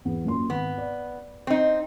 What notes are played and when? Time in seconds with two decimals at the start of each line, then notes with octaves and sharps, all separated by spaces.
0.05 E2 B3
0.25 F#2 A#2 C6
0.50 G#1 B3
0.78 D5
1.47 C4 D#4